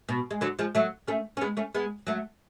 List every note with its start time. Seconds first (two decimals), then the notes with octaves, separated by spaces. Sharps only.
0.09 B2
0.31 G#3
0.41 D3 F#3
0.59 F3 G#3
0.75 F#3 A3
1.07 A3 C#4
1.37 C#4
1.41 G#3 B3
1.57 A3 C#4
1.74 G#3 B3
2.07 F#3 A3